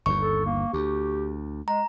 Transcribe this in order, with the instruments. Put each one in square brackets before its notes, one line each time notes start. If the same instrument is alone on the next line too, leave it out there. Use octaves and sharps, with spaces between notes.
[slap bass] G1 D#2 [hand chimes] C#6
[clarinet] A4
A#3
[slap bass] D2 [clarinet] G4
[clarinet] G#3 [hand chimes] A#5